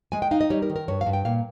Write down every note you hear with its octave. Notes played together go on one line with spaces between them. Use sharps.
G#3 G#5
G5
D#4 F5
D#5
G3 C#5
A#4
D#3
A#4
G2 C#5
F5
G2
G5
A#2 F5